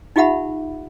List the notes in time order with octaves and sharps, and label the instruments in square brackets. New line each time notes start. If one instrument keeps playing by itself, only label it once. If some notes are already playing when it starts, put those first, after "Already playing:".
[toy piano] D#4 F4 G4 E5 F#5 B5